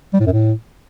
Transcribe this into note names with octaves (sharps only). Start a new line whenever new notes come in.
G3
A2
F#2
A2